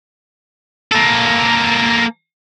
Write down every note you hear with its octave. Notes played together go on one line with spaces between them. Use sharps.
A#3 A4